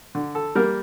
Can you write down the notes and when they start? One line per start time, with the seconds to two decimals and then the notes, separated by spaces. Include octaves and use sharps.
0.15 D3
0.35 A4
0.55 G3 A#3 A#4